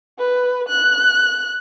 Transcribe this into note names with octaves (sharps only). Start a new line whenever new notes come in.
B4
F#6